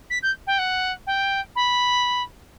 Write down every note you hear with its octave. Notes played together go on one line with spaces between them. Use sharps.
B6
G6
G5
F#5
G5
B5